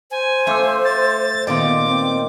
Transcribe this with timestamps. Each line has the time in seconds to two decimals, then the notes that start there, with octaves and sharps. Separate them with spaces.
0.11 C5 G#5
0.47 A3 F4 C6 D6 E6
0.85 A6
1.47 A#2 D#3 B3 F4 D#5 D6
1.86 C4